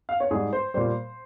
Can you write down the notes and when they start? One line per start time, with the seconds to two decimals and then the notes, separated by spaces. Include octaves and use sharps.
0.09 F5
0.20 C#5
0.31 G#2 G3 G#4
0.53 C5
0.74 A#2 G3 C5